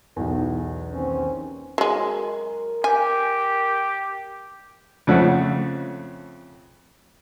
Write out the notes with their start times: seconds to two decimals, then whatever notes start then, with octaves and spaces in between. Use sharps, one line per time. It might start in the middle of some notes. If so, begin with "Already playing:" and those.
0.16 B1 E2
0.92 D#2 C4 C#4
1.78 F#3 G#3 A#4
2.84 G4 G#5
5.07 F2 C#3 F3 A3 E5 F#5